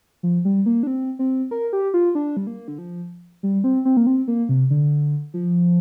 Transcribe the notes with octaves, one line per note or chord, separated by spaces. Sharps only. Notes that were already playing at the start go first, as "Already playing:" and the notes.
F3
G3
A#3
D4
C4
C4
A#4
G4
F4
D4
G3
A#3
D3
F3
G3
C4
C4
A#3
C4
A#3
C3
D3
F3